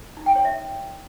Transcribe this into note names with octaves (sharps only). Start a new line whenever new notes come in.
D#4
G5
C#5
E5